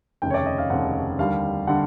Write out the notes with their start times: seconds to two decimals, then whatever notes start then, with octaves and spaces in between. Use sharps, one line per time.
0.22 F1 D#2 C#3 G5
0.30 C#5
0.34 D5
0.46 D#5
0.58 F5
0.70 F1 D#2 C#3 F#5
1.18 D#2 D3 G3 F5
1.67 D3 G3 F#5